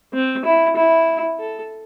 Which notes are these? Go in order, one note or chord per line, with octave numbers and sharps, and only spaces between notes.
C4
E4
E4
A4